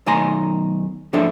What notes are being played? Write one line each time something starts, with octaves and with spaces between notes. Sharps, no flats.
B1 D#3 A3 G#5 A#5 C6
G#2 F3 D4 A4 E5